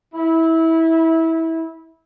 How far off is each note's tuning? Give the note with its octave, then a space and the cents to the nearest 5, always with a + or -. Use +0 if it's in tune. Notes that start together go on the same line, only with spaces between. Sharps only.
E4 -20